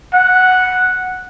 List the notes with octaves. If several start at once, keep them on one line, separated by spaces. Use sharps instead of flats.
F#5